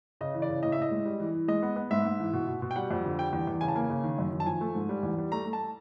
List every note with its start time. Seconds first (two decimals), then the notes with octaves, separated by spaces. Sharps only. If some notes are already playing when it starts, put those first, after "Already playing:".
0.21 C#3 D#5
0.34 E3
0.42 D5
0.49 C#3
0.63 A2 D#5
0.72 E5
0.77 A2 D#5
0.91 G#3
1.05 G3
1.20 E3
1.34 E3
1.48 G#3 D#5
1.62 B3
1.76 B3
1.91 G#2 E5
2.05 G#2
2.19 E3
2.33 B2
2.47 B2
2.62 B2
2.71 G5
2.76 G3 F#5
2.91 F2
3.05 D3
3.18 G3 G5
3.33 E2
3.47 E2
3.61 C#3 G#5
3.68 A5
3.76 A#3 G#5
3.90 C#3
4.04 D#3
4.19 F#2
4.33 D#3
4.40 A5
4.46 F3 G#5
4.61 A3
4.75 G#2
4.89 G3
5.03 E2
5.18 G3
5.32 A3 A#5
5.46 A3
5.53 A5